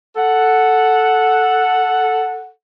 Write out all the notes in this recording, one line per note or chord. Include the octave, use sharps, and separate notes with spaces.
A4 F#5